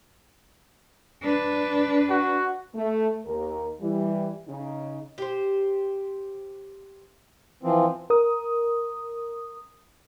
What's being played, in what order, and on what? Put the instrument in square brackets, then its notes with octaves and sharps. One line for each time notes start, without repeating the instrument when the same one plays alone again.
[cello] D4 B4
[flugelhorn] F#4
[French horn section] A3
D#2 A#4
E3 G3
C#3 D#4
[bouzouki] G4 C5
[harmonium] E3 F3 C4
[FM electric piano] A#4 D#6